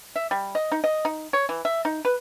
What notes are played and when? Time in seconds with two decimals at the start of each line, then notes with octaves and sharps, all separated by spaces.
0.16 E5
0.31 G3
0.55 D#5
0.72 D#4
0.84 D#5
1.05 D#4
1.33 C#5
1.49 E3
1.65 E5
1.85 D#4
2.05 B4